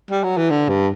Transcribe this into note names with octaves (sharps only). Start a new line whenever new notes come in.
G3
F#3
E3
D3
G2